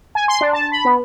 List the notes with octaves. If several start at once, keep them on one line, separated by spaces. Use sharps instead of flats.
G#5
C6
D4
A5
B5
B3